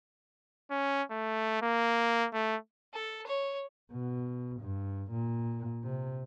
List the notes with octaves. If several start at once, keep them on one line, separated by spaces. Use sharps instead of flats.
C#4
A3
A#3
A3
A4
C#5
B2
G2
A#2
C3